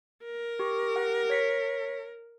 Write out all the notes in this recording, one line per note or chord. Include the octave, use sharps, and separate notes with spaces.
A#4
G4 C#6
G4 F#5
C#5 B6 C#7